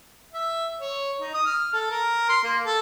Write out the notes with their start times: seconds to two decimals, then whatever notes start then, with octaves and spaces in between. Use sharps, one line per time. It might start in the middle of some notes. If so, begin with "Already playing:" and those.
0.33 E5
0.81 C#5
1.21 D#4
1.34 D#6
1.46 F6
1.73 A4
1.91 A#4
2.29 C6
2.44 A#3
2.65 A4